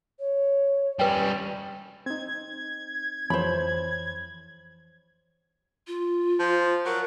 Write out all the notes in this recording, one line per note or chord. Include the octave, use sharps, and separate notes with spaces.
C#5
G3 C#4 B4 G5
C4 D#4 G#6
F2 E3 C5 C#5 B5
F4
F3
F#3 A#4